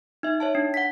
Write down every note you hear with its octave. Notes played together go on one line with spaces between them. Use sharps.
D#4 E5
C#5 E5 A5
D4
F#5 B6